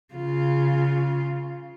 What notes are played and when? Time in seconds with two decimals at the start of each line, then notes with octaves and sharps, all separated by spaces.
0.14 C#3 F4